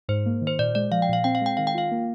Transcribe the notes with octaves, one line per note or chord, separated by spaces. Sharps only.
G#2 C5
A#3
D#3
C5
A#2 D5
G#3 D5
F3 F5
G5
A#2 F5
C4 G5
F5
G#3 G5
D#3 F5
G5
F4 F5
A#3